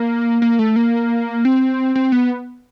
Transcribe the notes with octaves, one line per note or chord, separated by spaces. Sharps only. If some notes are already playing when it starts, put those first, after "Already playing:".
Already playing: A#3
A#3
A3
A#3
C4
C4
B3